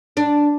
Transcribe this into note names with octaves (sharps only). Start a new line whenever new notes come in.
D4